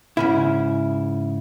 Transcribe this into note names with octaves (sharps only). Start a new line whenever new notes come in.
G#2 C#3 E4